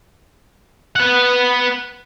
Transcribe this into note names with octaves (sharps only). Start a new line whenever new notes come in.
B4 F#5